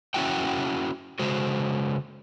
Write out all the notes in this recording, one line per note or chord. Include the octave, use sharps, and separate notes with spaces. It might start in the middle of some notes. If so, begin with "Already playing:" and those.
C#4 E4 F#4 E5 F#5 G5
C#3 G#3 F#4 C5